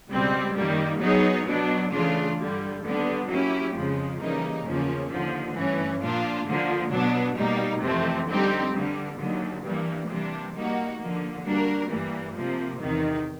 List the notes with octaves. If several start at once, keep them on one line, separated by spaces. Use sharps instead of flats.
C#2 B2 G3 C4
F#2 D#3 G3 A#3
F#3 B3 D#4 G#4 C#5
B2 F#3 B3 D4
C#3 E3 A3 D4 F4
G2 D3 G3
D#2 D3 G3 B3 D4
F#3 A#3 C#4 E4 G4
F2 C#3 F3 G#3
C#3 E3 G3 A#3 D#4
E2 C#3 F3 A#3 C#4
D#2 D3 F3
G2 E3 A3 C#4
A#2 F3 A#3 D4 F4
D3 F3 A#3
B2 F#3 B3 D4
B2 G3 A#3 D#4
F2 C3 E3 A3 C4
D3 G3 C4 D#4 G4
G2 D3 G3
D#2 D3 F#3
G2 E3 G3 A#3
C3 E3 G3 A#3 D4
G3 A#3 D#4 F#4
D3 F3 A#3
G3 A#3 D4 F#4 A#4
G2 E3 G3 A#3
C3 F3 A#3
E2 C3 D#3